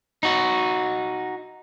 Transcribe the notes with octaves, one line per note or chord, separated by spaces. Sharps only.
D#4 F#4